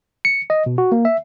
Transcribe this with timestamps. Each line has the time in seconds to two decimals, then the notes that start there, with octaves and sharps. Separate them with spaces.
0.25 C#7
0.50 D#5
0.66 B2
0.78 F#4
0.92 A#3
1.05 E5